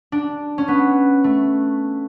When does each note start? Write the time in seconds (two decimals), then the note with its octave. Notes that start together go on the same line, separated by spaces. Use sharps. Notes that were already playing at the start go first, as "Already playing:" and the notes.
0.12 D4
0.58 C#4
0.68 B3
1.24 A3